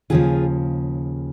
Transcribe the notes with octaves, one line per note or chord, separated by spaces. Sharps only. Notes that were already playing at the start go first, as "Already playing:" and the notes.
D#2 C#3 F3 F4 G#4